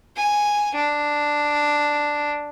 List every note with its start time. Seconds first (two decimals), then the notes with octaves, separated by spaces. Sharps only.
0.17 G#5
0.75 D4